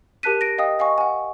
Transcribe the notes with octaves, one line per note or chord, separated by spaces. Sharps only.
G4 A#4 A5 F#6 B6 D#7
A#6 D7
D#5 F5 G5 D#6
D#5 F5 G#5 C#6
F#5 G#5